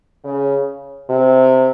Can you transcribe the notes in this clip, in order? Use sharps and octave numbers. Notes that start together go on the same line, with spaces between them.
C#3
C3